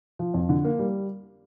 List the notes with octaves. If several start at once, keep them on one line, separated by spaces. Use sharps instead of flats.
F3
F2
D3
A#3
G3